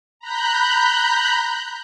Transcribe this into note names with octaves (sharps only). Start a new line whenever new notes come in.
A#5 B5 F#6 G6